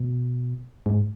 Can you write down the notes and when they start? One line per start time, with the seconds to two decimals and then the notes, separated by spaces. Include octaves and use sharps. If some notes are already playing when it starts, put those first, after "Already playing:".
Already playing: B2
0.86 G#2